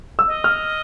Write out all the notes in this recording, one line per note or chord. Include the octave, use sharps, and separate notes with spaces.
E6
D#5
F6